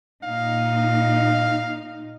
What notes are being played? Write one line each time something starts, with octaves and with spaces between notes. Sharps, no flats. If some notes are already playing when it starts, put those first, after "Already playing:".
A#2 D#4 F5